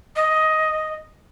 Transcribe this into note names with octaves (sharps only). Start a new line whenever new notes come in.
D#5